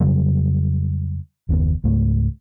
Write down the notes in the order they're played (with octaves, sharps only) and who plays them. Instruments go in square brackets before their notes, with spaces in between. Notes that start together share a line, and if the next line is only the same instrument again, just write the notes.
[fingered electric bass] F2 C#3 F#3 G3
F#1 D#2 C3 B3
C#2 G#2 A3